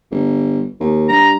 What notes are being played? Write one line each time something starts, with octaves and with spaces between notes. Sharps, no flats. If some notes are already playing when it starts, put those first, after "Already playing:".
G1
D#2
G2 A#5